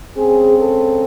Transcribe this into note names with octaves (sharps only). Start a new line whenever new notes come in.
C#3 G#3 C4 G#4
A4